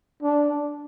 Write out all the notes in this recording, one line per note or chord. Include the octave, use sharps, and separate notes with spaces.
D4